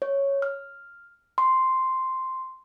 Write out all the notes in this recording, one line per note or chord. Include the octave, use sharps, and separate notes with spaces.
C#5
F6
C6